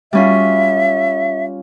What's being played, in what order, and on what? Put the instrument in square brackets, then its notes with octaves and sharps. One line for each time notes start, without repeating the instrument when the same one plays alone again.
[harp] G3 C#4 F4 [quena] E5